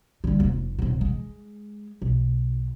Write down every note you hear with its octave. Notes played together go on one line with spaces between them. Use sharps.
D3 G3
F1 A#3
D#1 C3
G#3
B1